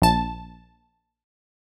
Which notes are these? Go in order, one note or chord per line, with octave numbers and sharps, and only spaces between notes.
A#1 A5